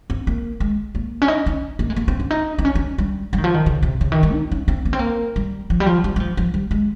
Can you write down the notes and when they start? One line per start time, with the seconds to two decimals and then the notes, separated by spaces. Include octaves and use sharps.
0.10 C4
0.27 A#3
0.60 G#3
0.95 A#3
1.22 C#4
1.28 D#4
1.46 C#4
1.79 A#3
1.90 G#3
1.96 A#3
2.08 C4
2.20 C#4
2.31 D#4
2.58 C4
2.65 C#4
2.75 C#4
2.98 G3
3.33 G3
3.38 D#3
3.44 F3
3.54 D#3
3.66 C#3
3.83 C3
4.01 C#3
4.12 D#3
4.23 G3
4.34 D#4
4.52 C#4
4.68 C4
4.85 A#3
4.93 C4
4.99 A#3
5.36 G3
5.70 F3
5.80 G3
5.86 F3
6.04 G3
6.16 G3
6.20 F3
6.37 F3
6.54 G3
6.71 G#3